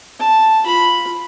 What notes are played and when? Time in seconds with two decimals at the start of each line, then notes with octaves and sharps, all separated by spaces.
0.20 A5
0.63 F4 B5